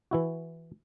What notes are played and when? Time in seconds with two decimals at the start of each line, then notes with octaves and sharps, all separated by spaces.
0.11 E3 E4 F#4